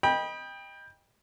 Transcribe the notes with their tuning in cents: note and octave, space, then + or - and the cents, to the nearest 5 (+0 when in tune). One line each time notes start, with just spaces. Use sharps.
D#5 +0 G5 +20 B5 -25